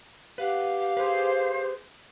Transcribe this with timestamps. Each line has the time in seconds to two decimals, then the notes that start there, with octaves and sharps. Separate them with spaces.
0.38 G4 B4 F5 F#5
0.97 G#4 B4 C5